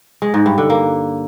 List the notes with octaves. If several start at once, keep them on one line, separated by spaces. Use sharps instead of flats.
G#3
G#2
G2
D3
A#3